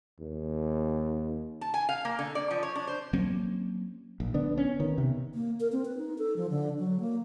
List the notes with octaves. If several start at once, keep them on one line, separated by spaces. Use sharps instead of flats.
D#2
A5
G#5
F5
A#3
D3
D5
F3
C#5
D4
C5
F#3 A#3 C4 C#4
A#1
D3 B3 D4
C#4
D#3 B3
C3
A#3
A#4
C4
B4
D#4
A4
F3
D3
F#3
A#3